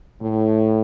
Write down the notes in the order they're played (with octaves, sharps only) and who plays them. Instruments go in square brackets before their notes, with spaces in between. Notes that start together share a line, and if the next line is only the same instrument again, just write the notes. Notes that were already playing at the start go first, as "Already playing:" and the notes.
[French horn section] A2